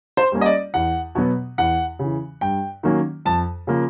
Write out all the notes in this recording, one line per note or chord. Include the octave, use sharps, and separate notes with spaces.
C5
G3 A#3 C#4
D#5
D5
E2 F#5
B2 F#3 B3
E2 F#5
C#3 E3
G2 G5
D#3 F#3 A#3 C#4
F2 A5
C#3 F3 A#3